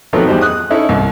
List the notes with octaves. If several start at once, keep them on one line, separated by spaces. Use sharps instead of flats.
D#3 F3 F#3 A3 B3 C4
E2 G3 D#4 C5
D#6 F#6
C#4 D#4 E4 A4
C2